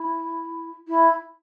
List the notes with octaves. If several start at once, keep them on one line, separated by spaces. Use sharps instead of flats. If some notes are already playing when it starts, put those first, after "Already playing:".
Already playing: E4
E4